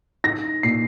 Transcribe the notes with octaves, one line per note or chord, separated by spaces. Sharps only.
D#4 A#6
A#2 C7